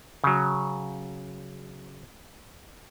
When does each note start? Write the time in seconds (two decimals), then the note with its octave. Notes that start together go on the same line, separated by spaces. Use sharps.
0.24 C#3 F#3